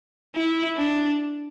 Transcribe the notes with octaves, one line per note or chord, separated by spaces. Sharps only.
E4
D4